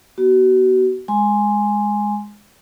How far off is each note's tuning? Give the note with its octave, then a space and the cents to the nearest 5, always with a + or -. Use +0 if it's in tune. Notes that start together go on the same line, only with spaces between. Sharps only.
B3 -25 F#4 +35
G#3 +0 G#5 +0 C6 +0